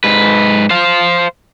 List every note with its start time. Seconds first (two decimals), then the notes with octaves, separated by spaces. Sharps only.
0.04 G#2 B4
0.70 C5 F5